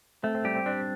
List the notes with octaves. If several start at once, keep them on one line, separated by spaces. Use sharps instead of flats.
A3 C4
C4
G3 G4
C4
C4 D4